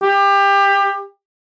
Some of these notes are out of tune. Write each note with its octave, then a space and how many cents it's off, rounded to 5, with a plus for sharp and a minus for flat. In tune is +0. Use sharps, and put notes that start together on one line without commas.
G4 +25